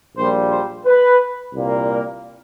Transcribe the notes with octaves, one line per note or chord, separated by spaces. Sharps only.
A#1 A#2 G3 C5
C5
B4
C2 A#2 G3 A#3
A#4